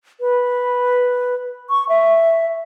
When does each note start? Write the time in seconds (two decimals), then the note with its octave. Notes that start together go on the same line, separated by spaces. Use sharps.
0.20 B4
1.70 C#6
1.89 E5